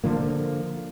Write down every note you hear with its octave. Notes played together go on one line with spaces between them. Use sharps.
D3 F3 A#3